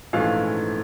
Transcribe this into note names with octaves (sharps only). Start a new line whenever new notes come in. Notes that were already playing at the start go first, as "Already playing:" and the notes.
A#1 G#2 E3 A3 C#4 F5